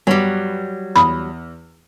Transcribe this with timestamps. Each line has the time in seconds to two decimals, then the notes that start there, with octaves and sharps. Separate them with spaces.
0.07 G2 F#3 G3 B3 C#5
0.96 E2 B5 D#6